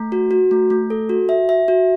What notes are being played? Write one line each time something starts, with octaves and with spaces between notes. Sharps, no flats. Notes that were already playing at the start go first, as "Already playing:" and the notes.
Already playing: A3
F#4
F#4
A3
A3
A4
F#4
E5
E5
F#4